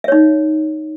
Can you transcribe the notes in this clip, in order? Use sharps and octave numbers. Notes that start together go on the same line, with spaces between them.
D#4 C#5 E5